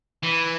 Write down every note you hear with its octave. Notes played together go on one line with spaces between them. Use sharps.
E3